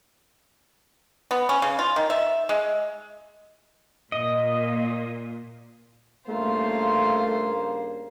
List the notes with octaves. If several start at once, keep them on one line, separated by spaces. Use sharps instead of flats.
B3
C#4
C#3
F4
D#3
E5
G#3
A#2 D#5
G2 C#3 A3 A#3 F4 C5